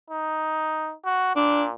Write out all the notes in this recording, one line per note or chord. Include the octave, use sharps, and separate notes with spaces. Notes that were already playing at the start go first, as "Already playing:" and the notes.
D#4
F#4
A#2 D4